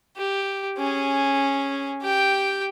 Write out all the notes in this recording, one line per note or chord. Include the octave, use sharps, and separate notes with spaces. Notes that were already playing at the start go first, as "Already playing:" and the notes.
G4
C#4 G#4
G4 G5